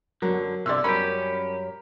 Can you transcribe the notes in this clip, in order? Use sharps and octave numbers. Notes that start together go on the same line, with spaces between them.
F#2 D3 F#3 A#4
C2 G2 D3 D5 C6 E6
F#2 G3 C#4 G4 A#4 C#5 B5